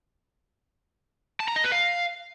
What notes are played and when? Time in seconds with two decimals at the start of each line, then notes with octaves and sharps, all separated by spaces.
1.40 A5
1.48 A#5
1.56 D#5
1.64 B4
1.72 F5